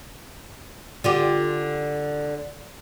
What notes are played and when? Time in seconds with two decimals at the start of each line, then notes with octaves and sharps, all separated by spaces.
1.04 D3 F4 G4